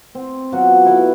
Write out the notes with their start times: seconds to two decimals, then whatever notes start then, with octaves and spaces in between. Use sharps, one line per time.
0.15 C4
0.52 F#3 B3 F4 F#4
0.85 E4 A4 B4